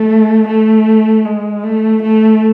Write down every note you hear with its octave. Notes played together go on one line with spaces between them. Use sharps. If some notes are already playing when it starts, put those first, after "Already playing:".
Already playing: A3
A3
G#3
A3
A3